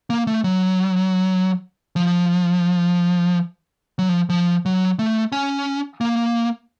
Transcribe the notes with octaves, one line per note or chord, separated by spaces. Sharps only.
A#3
A3
F#3
F3
F#3
F3
F3
F#3
A3
C#4
A#3